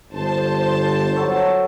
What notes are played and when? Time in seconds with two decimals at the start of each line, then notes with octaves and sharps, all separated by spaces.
0.13 G1 C5 A5
1.16 F#3 A4 C#6